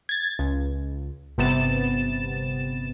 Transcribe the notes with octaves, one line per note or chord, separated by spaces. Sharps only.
G#6 A6
C#2
G1 C3 B3 A6 E7